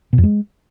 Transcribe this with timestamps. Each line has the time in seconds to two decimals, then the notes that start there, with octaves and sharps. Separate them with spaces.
0.13 B2
0.18 F2
0.24 G#3